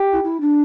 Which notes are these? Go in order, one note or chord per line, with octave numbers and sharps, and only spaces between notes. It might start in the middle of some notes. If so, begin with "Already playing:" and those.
Already playing: G4
E4
E4
D4